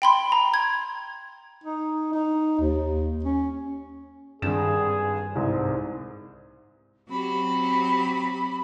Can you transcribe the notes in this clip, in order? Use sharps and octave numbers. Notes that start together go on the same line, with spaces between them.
G5 B5 C6
A#5
G#6
D#4
D#4
D#2
C#4
G#1 G2 D4 G#4 E7
C2 G#2 C3 C5
F#3 C4 G4 B5